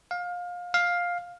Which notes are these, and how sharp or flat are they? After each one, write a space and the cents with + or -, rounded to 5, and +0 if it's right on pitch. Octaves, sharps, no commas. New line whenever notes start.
F5 +25
F5 +10